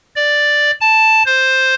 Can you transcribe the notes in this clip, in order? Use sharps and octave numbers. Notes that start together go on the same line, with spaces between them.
D5
A5
C5